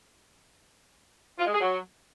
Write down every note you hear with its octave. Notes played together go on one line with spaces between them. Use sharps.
F4
G#3
G#4
F#3